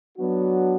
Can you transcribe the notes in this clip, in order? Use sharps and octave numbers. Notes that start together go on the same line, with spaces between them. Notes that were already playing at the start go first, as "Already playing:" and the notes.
F#3 B3 D4 F#4